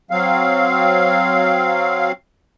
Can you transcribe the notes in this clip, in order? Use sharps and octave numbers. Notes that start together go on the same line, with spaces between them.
F#3 C4 F5